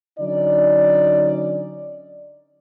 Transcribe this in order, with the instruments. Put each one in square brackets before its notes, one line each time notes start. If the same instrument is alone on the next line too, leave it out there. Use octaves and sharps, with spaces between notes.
[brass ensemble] D3 F#3 C#4 D#4 D5